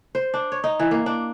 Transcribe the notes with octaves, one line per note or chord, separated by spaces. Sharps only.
C5
D4
C#5
D#4
E3
A#3
D4